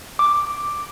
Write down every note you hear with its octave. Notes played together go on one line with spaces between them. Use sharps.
D6